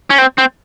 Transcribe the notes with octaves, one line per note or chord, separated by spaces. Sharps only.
C#4
C4
C4